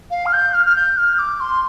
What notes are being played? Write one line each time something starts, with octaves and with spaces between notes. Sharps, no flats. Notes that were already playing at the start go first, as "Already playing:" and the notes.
F5
F6
G6
F6
F6
G6
F6
D6
C6